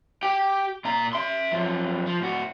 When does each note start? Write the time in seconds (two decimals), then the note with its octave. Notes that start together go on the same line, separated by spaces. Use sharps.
0.23 G4 G5
0.85 A#2 A#5
1.13 E5 C6
1.52 F#2 F3
2.06 F3
2.22 A2 F#4